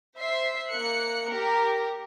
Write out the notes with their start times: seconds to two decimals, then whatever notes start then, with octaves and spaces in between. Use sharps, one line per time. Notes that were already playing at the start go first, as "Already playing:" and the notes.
0.17 C5 E5 C7
0.72 A#3 F#6 C#7
1.30 G4 A#4